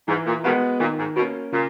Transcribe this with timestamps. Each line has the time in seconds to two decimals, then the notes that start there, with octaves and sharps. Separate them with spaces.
0.08 G#2 E3
0.27 A#2
0.44 B2 D#3 G#3 B3 F#4 B4
0.80 A#2 D#3
0.98 G#2
1.16 B2 A#3 C#4
1.52 A#2 C#3